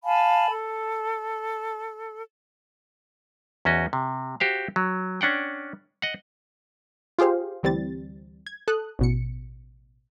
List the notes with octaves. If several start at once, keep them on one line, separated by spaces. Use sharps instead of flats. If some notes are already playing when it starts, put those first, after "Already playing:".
F5 G#5 A5 B5
A4
E2 C#4 F#4 D#5
C3
F#4 G4 C5 F5
F#3
C#4 D4 F#5 G5
D#5 F#5
F4 G4 G#4 C5 F5
D2 E3 G3 C4 A6
G#6
A4 D#6 F#6
A1 B2 C#7